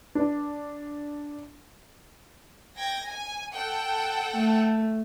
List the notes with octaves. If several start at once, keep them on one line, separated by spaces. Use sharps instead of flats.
D4
G5 G#6 A#6
G#5
A4 F#5 G5
A3